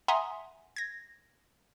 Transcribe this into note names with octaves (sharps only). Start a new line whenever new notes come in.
E5 F#5 G#5 A#5 C6 D#6
G#6 A#6